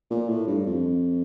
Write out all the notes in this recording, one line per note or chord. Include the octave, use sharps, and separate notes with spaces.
A#2
A2
G2
F2